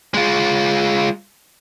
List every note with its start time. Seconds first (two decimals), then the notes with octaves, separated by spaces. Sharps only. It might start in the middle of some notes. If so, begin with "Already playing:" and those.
0.14 G#3 F4